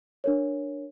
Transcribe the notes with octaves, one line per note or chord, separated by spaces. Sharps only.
D4 A#4 C#5